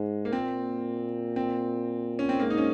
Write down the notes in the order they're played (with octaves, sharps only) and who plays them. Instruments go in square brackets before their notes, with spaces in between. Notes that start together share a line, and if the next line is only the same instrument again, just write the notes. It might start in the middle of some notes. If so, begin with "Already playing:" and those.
Already playing: [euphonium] G#2 [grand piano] G#3
[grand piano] A#3
[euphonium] A#2 [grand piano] C4
[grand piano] C4
C#4
C4
[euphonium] G#2 [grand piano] A#3
[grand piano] D#4
C#4